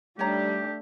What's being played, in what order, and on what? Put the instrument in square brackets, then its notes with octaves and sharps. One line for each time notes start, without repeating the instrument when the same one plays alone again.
[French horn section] G3 [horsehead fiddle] A3 D4 [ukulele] D#4 C#5 A#5 [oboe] G4